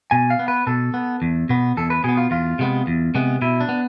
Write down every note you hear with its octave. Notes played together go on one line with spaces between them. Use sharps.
B2 G#5
F5
B3
B4
B2 A4
B3
E2
B2 B3
E2 A4
B4
B2 B3 G#4
F4
E2 F4
C3 G#3 B3
E2
C3 G#3 B3
B2 E4
D4
B3